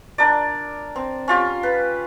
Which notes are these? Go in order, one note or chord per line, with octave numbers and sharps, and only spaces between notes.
D4 A#4 D5
C4
C#4 F4 G4
B4